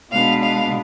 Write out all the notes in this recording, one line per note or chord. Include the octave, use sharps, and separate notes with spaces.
B2 G#3 B3 D4 F5
F5